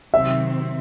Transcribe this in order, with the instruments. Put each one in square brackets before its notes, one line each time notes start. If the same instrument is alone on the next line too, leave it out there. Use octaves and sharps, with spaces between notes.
[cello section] C3 D#3 F#3 C4 [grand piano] E5